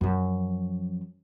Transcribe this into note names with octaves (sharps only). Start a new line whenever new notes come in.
F#2 F3